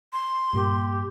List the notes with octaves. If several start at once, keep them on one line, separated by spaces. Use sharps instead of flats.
C6
G2 A#2 A#3 G4